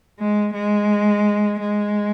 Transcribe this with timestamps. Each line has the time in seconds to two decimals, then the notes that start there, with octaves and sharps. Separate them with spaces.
0.19 G#3
0.54 G#3
1.60 G#3